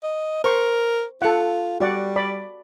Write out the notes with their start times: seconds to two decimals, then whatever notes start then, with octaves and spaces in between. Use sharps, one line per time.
0.03 D#5
0.44 A#4 C5 C#6
1.22 F4 A4 F#5
1.80 G3 F#4 D5 F#5
2.16 D5 B5